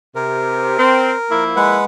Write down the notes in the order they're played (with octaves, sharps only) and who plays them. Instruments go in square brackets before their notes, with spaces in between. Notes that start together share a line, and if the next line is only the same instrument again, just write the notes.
[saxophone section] C3 [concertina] A#4
[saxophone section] C4
F3 A#3 E4
[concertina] G#3 B4 F#5